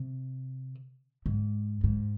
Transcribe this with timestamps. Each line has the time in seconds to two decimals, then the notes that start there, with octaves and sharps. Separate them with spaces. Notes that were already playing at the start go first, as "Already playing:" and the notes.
Already playing: C3
1.26 G#2
1.84 G#2